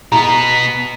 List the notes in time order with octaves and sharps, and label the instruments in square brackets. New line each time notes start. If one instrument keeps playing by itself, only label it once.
[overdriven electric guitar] B2 B3 [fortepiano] A#5